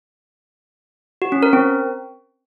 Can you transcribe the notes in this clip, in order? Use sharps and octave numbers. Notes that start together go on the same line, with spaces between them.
F#4
C#4
A#4
C4